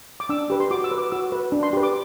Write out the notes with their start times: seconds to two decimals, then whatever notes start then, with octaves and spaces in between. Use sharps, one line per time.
0.20 D6
0.29 D4 E6
0.50 G4 B4
0.60 C6
0.71 F#4 D6
0.84 E6
0.91 B4
0.98 D6
1.12 F#4 E6
1.32 B4
1.52 D4
1.63 C6
1.73 G4 B4
1.83 D6